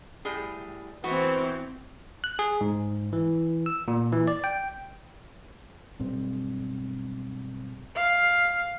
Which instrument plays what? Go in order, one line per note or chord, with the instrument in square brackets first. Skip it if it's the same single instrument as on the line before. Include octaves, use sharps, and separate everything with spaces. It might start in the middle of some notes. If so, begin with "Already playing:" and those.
[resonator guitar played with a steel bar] A2 G3 G#4
[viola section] E3 C4 [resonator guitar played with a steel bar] B3 F#4
[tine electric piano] F#6
G#4
G#2
E3
E6
A#2
E3
D5
G5
[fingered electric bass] B1 G2 C4
[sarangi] F5